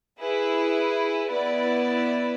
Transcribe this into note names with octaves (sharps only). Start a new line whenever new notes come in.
E4 G#4 B4
B3 E4 B4 D5